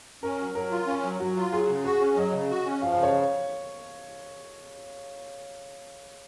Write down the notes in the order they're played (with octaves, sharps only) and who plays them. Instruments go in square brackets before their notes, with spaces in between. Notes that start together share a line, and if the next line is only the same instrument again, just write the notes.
[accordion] C#4 [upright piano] A#4
[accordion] F#3
[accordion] F#3 [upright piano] A#4
[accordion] F4
C#4
F#3
[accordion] F#3 [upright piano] F#4
[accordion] F4
[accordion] F#3 [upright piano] G#4
[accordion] C#3
[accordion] F#4 [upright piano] G#4
[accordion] C#4
[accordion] F#3 [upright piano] D#5
[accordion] C#3
F#4
C#4
[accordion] F3 [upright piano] F5
[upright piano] F5
[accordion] C#3
[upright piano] C#5